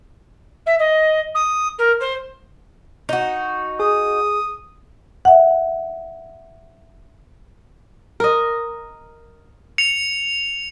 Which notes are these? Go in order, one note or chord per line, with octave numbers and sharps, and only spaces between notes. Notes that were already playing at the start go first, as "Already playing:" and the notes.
E5
D#5
D#6
A#4
C5
D#4 F#4
G#4 D#6
E5 F#5
A#4 D#5
C#7 F7